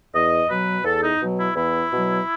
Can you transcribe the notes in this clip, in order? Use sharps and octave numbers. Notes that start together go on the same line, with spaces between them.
E2 D#5
B2 F#3 B4
E2 A4
D#4
B2 F#3
E4
E2 E4
B2 F#3